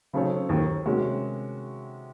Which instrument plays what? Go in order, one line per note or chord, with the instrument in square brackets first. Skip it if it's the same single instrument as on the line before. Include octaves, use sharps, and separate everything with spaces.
[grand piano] C#3 [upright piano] F#3 C4 D#4 A4 C#5
[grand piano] D#2 D#3
[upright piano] C3 D#3 G#3 C#4 F#4